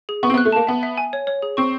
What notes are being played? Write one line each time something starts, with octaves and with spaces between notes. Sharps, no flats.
G#4
B3 C#6
C4
B3
F#6
A3
A#3 A5
B3 E5
E5
G#5
C#5
C#5
G#4
C4 C#6